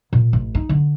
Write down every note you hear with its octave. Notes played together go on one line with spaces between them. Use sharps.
A#2
A1
D#4
D3